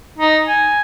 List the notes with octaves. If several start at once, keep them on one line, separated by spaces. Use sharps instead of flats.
D#4
G#5